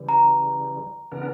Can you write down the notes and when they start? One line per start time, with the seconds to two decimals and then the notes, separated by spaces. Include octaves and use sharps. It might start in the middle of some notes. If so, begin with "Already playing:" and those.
Already playing: C#3 E3 G3
0.09 A#5
1.12 C#3 E3 B3 D4 A#4